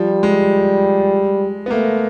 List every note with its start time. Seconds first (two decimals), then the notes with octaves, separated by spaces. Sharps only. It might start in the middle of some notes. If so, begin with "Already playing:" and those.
Already playing: F3 G3
0.23 G#3
1.66 B3
1.71 A3 A#3